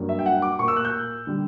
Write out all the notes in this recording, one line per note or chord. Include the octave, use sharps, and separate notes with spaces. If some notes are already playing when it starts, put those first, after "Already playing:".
Already playing: G2 F#3 A#3
E5
G5
F#5
D6
A#2 A#3 C#6
E6
F#6
G6
D3 G3